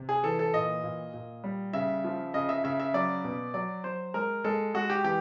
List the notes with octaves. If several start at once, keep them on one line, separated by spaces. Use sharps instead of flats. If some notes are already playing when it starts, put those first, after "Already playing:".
Already playing: C3
G#4
E3 A4
A4
A#2 D#5
A#2
A#2
G3
C#3 E5
F3
C#3 D#5
E5
C#3 E5
E5
F#3 D5
B2
F#3 D5
F#3 C5
G#3 A#4
G#3 A4
G#3 F#4
G4
E3 G4